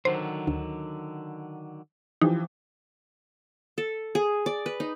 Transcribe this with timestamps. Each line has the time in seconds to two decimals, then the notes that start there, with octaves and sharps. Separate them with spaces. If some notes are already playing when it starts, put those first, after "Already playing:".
0.05 D3 D#3 F#3 C5
0.47 D2
2.21 E3 F3 D#4 G4
3.78 A4
4.15 G#4
4.46 D5
4.66 B4
4.80 D#4